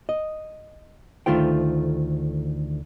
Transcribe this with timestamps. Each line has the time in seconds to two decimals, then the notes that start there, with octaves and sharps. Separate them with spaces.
0.09 D#5
1.26 D2 D#3 A3 F4 C5 G5